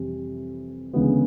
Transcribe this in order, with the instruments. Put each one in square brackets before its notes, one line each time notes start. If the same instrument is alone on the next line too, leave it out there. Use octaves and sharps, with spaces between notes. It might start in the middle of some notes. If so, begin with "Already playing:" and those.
Already playing: [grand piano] F2 C3 E3 G3 C4
D2 C#3 E3 G#3 B3